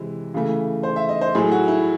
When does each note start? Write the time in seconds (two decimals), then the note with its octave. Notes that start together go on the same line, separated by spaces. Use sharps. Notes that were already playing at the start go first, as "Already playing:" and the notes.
Already playing: C3 E3 G#3
0.34 C#3 E3 A3
0.83 C5
0.96 E5
1.09 D#5
1.21 C5
1.35 A2 F#3 A3 G#4
1.52 F#4
1.68 E4